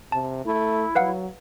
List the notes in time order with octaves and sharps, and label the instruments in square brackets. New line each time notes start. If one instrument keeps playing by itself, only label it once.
[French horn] C3 [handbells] A5
[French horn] A3 [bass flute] E4
[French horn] F#3 [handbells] B4 F5 F#5